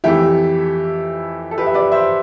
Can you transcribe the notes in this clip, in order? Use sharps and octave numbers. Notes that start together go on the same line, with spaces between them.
F2 E3 A3 E4 G4
A4
G4 B4
E5
B4 D5
C5 E5